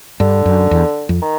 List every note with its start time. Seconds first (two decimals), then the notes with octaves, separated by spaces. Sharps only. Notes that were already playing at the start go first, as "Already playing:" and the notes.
0.20 G2 D3
0.45 F#2
0.71 E2
1.09 F2
1.22 D#3